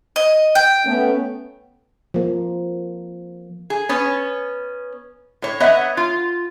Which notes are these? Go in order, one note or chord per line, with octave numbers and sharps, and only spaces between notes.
D#5
G5
A3 B3 C#4
F3 A#3
G#4
B3 C#4 C#5
A2 C#5
B3 C#5 D#5 E5 F#5
F4